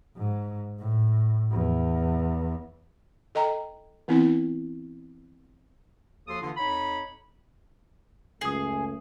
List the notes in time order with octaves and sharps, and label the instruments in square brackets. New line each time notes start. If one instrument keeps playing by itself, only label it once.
[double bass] G#2
A2
E2
[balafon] A4 D#5 G5 A#5
E3 B3 C4 E4
[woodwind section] D#2 F3 F#4 A4 C6 D#6
D3 E3 A#3 D4 F4
F2 D#4 C#5 B5
[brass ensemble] C#2 F#2 A3 [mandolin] G#4 [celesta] D#6 C7